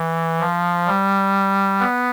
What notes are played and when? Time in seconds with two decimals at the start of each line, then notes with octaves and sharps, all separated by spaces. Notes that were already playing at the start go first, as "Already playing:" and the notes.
Already playing: E3
0.40 F3
0.87 G3
1.80 B3